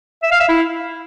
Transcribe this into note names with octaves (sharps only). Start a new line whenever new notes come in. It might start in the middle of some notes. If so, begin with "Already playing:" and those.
E5
F5
E5
E4